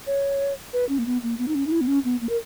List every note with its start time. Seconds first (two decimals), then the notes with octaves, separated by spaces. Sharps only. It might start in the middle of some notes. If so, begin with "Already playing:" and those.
0.07 C#5
0.73 B4
0.89 C#4
0.99 A#3
1.06 B3
1.23 A#3
1.39 B3
1.48 D#4
1.55 C#4
1.67 D#4
1.72 E4
1.81 B3
1.88 C#4
2.05 B3
2.21 A#3
2.29 A#4